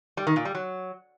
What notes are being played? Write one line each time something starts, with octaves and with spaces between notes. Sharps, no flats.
G3
D#3
A#2
G3
F#3